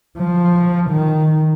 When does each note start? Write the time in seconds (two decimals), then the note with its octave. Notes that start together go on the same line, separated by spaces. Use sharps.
0.18 F3
0.90 D#3